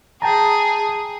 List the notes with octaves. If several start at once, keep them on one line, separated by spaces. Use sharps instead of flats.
G#4 G5 A5 A#5